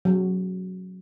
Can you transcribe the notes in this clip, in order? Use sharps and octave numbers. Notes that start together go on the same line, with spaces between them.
F#3